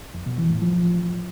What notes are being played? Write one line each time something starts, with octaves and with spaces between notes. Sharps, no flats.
F2
B2
E3
A2
F3